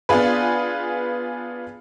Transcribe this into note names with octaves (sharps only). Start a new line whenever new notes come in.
B3 D4 F4 G#4 B4